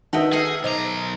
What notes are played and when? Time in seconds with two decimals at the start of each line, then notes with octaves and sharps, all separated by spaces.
0.13 D#3 F#4 B4 D#5 E5 F#5 A5
0.32 F#4 G#4 A4 D#5 E6 F6
0.64 B1 C5 D#5 A#5 D6